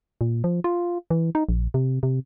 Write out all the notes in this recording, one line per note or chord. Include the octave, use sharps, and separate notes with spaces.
A#2
F3
F4
E3
D#4
A#1
C3
C3